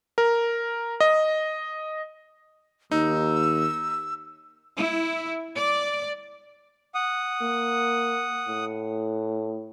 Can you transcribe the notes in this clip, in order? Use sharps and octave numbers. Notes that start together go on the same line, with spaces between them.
A#4
D#5
D#2 D#4 E6
E4
D5
F#5 D#6
A#3
A2